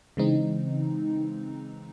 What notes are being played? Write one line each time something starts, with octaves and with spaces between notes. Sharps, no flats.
C#3 E3 G#3 C4 D#4